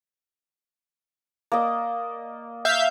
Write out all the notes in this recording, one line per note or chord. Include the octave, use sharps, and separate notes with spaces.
A#3 D5 D#5
E5 F5 G6